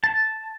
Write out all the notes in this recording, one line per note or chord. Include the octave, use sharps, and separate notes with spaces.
A5